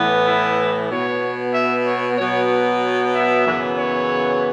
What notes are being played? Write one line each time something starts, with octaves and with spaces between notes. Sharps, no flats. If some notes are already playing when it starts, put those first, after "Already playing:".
Already playing: A2 E3 B3
E4
B2 B3 C#5
E5
C#5
B2 F#3 B3 C#5
C#5
E5
F#2 C#3 E3 B3
C#5